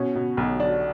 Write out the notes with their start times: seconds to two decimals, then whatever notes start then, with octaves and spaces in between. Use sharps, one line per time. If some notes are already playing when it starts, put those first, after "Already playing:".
Already playing: B2 C#4
0.15 B2
0.37 B1
0.60 F#3 D4